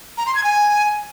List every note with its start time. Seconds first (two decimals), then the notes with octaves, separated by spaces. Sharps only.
0.17 A#5
0.26 C6
0.35 G#6
0.44 G#5